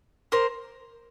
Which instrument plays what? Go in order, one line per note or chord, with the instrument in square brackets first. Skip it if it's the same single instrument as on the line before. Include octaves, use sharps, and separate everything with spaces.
[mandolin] A#4 C5